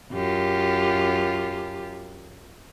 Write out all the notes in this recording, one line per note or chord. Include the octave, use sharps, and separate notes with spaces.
F#2 F4 G4